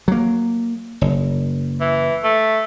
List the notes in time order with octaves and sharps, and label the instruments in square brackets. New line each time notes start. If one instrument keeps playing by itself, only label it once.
[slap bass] F#3 A#3
F#1
[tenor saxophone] E3
A3